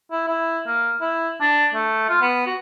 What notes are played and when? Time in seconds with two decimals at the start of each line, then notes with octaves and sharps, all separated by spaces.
0.11 E4
0.28 E4
0.67 A#3
1.01 E4
1.41 D4
1.74 A3
2.09 F4
2.21 B3
2.47 F#4